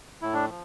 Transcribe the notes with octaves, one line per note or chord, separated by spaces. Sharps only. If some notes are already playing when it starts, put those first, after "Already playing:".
A2 E4
D4
F3